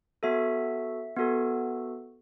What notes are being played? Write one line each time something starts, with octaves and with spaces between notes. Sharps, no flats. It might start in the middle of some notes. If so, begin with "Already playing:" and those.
B3 F#4 A4 E5
B3 F#4 A4